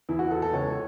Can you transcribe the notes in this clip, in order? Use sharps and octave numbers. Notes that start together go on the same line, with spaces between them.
E2 E4
F#4
E2 A4
A4
C#2 C#5